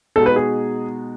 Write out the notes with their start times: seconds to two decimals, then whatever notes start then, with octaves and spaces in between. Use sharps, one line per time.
0.16 B2 G#3 D#4 F#4 A4
0.26 B4
0.36 G#4